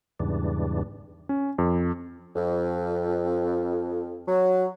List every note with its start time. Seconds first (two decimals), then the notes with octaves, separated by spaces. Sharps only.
0.20 E2 G#2 C#3 E3 G3 D4
1.29 C#4
1.58 F2
2.35 F2
4.27 F#3